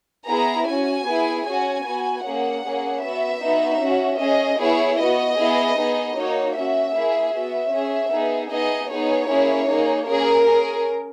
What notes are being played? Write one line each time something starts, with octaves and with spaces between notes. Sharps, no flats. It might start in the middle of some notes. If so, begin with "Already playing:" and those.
B3 E4 G#4 A#5
C#4 F#4 G#5
B3 E4 G#4
C#4 F#4 G#5
B3 F#4
A#3 C#4 G#4 F#5
A#3 C#4 G#4
B3 F#4 E5
B3 D#4 F#4
C#4 F#4
C#4 G#4 D#5
B3 E4 G#4 C#5
B3 F#4 D#5
B3 E4 G#4
B3 D#4 G#4
A#3 D#4 F#4 C#5
C#4 F#4 E5
A#3 E4 G#4
B3 F#4 E5
C#4 G#4
B3 D#4 G#4
B3 D#4 G#4 D#5
B3 D#4 G#4 C#5
A#3 C#4 E4 G#4
A#3 D#4 G#4
A#3 C#4 G#4 A#4
C#4 G#4